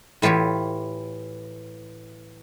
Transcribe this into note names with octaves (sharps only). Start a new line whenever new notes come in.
A2 E3 F4 G4 C#5